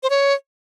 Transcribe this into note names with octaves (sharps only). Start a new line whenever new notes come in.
C5
C#5